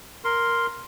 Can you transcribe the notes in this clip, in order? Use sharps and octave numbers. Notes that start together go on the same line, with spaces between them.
A#4 C6